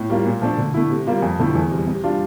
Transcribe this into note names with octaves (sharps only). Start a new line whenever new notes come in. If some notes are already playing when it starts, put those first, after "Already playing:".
Already playing: A2
G3 A#3 F4
A#2
F3 A3 D4
D3
A3 E4
C3
G3 A#3 F4
F2
D3 F3 A3 E4
E2
C3 G3
C3
G3 D4 F4